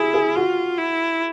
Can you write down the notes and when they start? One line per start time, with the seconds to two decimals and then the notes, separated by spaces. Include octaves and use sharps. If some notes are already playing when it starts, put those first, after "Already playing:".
Already playing: E4 G#4
0.14 G#4
0.36 F4 F#4
0.78 E4